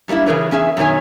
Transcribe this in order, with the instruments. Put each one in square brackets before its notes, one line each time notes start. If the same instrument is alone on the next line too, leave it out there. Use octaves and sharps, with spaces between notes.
[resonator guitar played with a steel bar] F#2 G3 A#3 D4 E4
C#3 E3 G#4 A#4 B4 C#5
E2 C#4 G#4 E5
F#2 B2 D#3 C#5 G#5